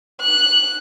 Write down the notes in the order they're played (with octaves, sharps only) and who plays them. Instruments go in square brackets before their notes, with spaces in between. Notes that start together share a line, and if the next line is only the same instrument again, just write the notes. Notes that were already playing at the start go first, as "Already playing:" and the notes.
[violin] F#6